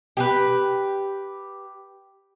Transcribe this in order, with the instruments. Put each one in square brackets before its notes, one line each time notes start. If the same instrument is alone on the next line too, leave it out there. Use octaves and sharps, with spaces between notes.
[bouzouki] G4 G#4 B4